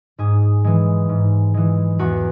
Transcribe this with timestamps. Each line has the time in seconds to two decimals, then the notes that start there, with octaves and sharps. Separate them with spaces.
0.18 G#2 G#4
0.64 E3 G#3
1.09 G#2
1.54 E3 G#3
1.99 E2 F#4